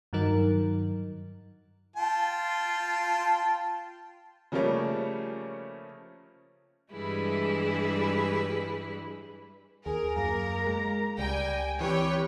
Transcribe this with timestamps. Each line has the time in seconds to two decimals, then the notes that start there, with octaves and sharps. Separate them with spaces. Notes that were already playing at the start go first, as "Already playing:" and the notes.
0.13 G2 D#3 F#3 D#4 A#4
1.96 F4 G5 A5
4.52 C#3 F3 G3 A3 A#3 C#4
6.92 G2 E3 G3 G#3 E4 B4
9.86 D#2 G#4 A#4
10.17 F#2 A#3 A#5
10.66 G#3
11.18 C#2 G3 G5 G#5
11.81 E3 C4 G4 B4 C#5 G5